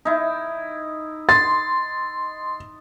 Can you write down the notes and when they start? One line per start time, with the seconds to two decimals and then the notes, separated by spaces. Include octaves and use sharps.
0.05 D#4 E4
1.29 C6 A6